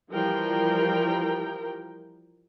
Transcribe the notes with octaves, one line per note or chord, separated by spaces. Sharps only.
E3 F3 G3 A#4 G5